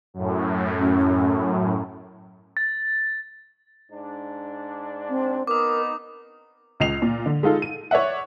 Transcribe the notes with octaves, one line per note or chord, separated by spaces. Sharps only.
F#2 A2
C#4
A6
G#2 D4
C4
B3 D#4 A#4 D6 D#6
C#2 D#5 C7 F7
A#2
D3
G#3 D#4 F4 A4
D#7
C#5 D5 E5 F#5